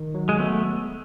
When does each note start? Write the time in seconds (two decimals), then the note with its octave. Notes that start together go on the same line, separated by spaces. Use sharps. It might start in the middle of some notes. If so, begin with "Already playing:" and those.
Already playing: D#3
0.15 F#3
0.29 G#3
0.39 A3 B3